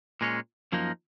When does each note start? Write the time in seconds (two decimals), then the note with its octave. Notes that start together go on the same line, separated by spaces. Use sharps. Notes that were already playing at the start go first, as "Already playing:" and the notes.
0.21 A#2 G#3 C#4
0.72 F#2 F3 A#3 D#4